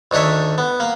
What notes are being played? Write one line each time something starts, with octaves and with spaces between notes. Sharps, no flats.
D2 D#3 D4 C#5 E5
B3
A#3